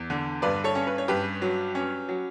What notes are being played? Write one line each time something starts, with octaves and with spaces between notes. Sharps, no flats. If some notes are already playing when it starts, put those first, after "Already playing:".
Already playing: E2
D3
G2 B4 D5
A4 C#5
C#4
B4
C#5
G2 G4 B4
F#3
C#4
F#3